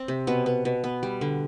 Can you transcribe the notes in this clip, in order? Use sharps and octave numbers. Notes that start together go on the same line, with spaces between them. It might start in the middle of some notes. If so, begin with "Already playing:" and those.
Already playing: C4
C3
B2 B3
B3
B2
B3
G3
D3